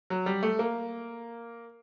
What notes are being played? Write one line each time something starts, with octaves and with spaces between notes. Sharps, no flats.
F#3
G3
A3
A#3